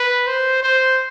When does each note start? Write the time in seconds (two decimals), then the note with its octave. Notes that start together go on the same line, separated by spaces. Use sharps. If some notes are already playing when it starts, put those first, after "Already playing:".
Already playing: B4
0.27 C5
0.63 C5